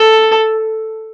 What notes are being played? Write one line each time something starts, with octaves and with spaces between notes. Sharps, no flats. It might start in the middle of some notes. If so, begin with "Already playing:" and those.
Already playing: A4